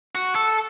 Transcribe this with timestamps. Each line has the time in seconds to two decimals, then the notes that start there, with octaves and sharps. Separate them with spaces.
0.15 F#4
0.35 A4